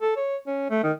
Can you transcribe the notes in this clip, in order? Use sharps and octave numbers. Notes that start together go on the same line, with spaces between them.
A4
C#5
C#4
A3
D#3